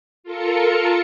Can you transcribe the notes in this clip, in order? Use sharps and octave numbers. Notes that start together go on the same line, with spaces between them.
F4 A4 A#4 C#7